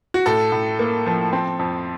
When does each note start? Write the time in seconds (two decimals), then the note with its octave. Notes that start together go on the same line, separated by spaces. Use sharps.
0.14 F#4
0.26 A2 A4
0.52 A2
0.79 A#3
1.06 F3
1.33 C4
1.59 F2